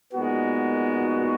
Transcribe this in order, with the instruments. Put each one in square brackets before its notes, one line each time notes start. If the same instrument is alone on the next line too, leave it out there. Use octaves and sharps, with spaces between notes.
[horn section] A#2 G#3 D#4 F#4 [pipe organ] B3